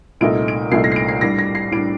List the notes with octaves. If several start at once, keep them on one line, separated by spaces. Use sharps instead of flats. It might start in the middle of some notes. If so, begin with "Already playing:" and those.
C2 A#2 A3 D#4 D7
D7
C2 A#2 A3 D#4 C7
A#6
C7
D7
C7
A2 G3 D4 A#6
A#6
C7
A2 G3 D4 D7